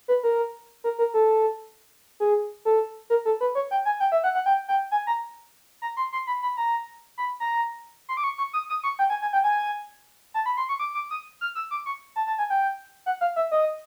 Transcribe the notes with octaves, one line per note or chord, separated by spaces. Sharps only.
B4
A#4
A#4
A#4
A4
G#4
A4
A#4
A4
B4
C#5
G5
G#5
G5
E5
F#5
F#5
G5
G5
G#5
A#5
A#5
C6
C6
B5
B5
A#5
B5
A#5
C6
D6
C#6
C#6
D#6
D#6
C#6
G5
G#5
G#5
G5
G#5
A5
B5
C6
C#6
D6
D6
D#6
F6
E6
D6
C#6
A5
A5
G#5
G5
F#5
F5
E5
D#5